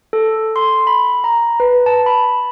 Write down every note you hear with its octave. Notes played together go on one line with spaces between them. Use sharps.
A4
C6
B5
A#5
B4
A5
B5